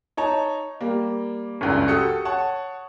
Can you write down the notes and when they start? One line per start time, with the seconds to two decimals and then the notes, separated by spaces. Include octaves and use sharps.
0.17 D#4 C#5 A5 A#5
0.81 G3 A#3
1.61 F#1 C#2 G2
1.88 F#4 G4 A4 D#6 C#7
2.25 C#5 F#5 A5 C#6